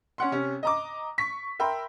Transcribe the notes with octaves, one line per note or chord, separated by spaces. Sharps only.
C#4 F#5 C6
C3 C#4
D#5 A#5 D6
C#6 B6
A#4 E5 G5 B5 C6